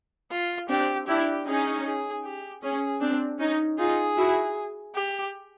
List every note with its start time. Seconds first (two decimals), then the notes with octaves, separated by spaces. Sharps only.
0.31 F4
0.69 C4 D4 G4
1.08 D4 E4 G4
1.47 C#4 D#4 G#4
1.85 G#4
2.25 G4
2.63 C#4 G#4
3.01 C4 D4
3.39 C#4 D#4
3.79 D#4 F4 G#4
4.18 E4 F#4
4.95 G4